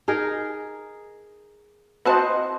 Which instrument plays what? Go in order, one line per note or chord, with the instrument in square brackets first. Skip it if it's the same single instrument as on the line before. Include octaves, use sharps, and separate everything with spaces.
[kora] D#4 G#4 A#4
[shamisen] C4 F#4 A5 [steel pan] B4 C5 D#5